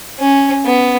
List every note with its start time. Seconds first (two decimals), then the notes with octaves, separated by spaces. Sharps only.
0.19 C#4
0.65 B3